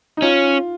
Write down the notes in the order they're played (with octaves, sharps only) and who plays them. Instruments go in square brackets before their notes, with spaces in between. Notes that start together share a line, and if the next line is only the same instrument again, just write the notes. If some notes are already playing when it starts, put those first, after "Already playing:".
[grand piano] D#4
[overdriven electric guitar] C#4 [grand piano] F4